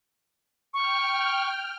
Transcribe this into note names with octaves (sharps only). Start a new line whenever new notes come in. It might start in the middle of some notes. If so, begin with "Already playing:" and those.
G5 C#6 F6